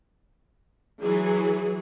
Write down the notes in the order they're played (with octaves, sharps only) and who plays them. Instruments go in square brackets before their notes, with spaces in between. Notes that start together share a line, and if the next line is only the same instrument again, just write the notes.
[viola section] E3 F#3 G#4